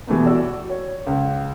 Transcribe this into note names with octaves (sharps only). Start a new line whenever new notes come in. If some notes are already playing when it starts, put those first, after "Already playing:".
B2 E3 G3 A3 B3
F#4 D5 E6
C#5
C#2